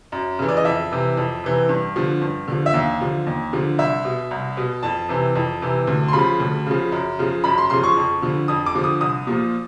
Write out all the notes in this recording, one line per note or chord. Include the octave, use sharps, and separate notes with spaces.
F#2
C#3 E3
D5
D#5
F2 E5
C3 E3
F2
C3 E3
G2
D3 F3
G2
D3 F3
E5
D#2 F5
D3 F3
D#2
D3 F3
C2 E5
B2
C2
B2
F2 A5
C3 E3
F2
C3 E3
D2
C6
C#3 F3 B5
D2
C#3 F3
F#2
C#3 F3
F#2 B5
C6
C#3 F3 C6
C#6
F2
D3 F3
F2 D#6
D6
D3 F3
D#6
C2 D#6
A#2 F3